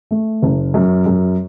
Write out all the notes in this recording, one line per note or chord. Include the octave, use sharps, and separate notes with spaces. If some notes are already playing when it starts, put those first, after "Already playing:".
A3
F#1
F#2
F#2